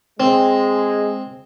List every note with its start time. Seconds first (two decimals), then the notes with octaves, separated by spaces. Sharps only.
0.20 G#3 C4